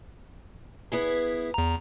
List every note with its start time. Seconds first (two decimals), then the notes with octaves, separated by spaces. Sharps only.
0.92 B3 E4 G#4
1.54 E2 A#5